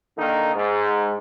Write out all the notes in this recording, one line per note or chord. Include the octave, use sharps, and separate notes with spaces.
D3 D#3 A#3 D#4
G#2